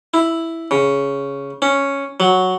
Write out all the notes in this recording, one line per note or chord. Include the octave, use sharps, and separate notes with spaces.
E4
C#3
C#4
F#3